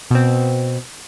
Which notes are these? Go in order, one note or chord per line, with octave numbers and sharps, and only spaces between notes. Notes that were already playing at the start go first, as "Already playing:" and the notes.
B2 C4